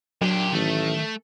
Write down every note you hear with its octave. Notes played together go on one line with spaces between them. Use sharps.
A#2 F#3 D4 G4
A1 D#3 A3